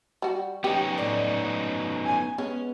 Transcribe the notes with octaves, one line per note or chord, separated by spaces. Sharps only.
G3 F#4
B3 C#4 D#4 G4
A2 D5
G#5
G#3 B3 C#4